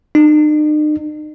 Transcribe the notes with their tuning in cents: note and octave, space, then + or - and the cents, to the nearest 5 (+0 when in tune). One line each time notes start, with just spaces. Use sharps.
D#4 -45